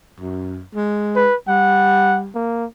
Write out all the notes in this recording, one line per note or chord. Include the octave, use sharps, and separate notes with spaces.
F#2
G#3
B4
G3 F#5
A#3